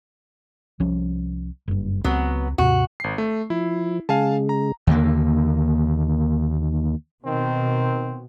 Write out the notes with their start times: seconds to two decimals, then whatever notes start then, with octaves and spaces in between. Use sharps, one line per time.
0.80 C2 F3 C#4
1.68 F#1 G2
2.04 C#2 F#3 B3 C4
2.58 D#2 G#2 C3 F#4
3.00 G#1 C7
3.18 A3
3.50 F3 E4
4.09 C#3 G#3 F5 G#5 A5
4.49 A#5
4.87 D#2 D3 A#3
7.25 B2 D#3 C4